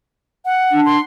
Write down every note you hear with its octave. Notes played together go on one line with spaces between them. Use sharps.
F#5
D4
C6